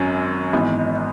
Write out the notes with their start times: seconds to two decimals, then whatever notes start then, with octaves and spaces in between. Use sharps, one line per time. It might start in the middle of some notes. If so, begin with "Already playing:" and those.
Already playing: G#1 F#2 F#3 C#4
0.53 G#1 G#2 E3 B3